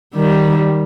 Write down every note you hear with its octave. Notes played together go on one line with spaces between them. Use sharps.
D#3 G3